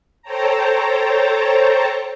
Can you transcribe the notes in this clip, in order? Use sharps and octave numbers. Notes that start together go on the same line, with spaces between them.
A4 C5 C#5 G5 A5 A#5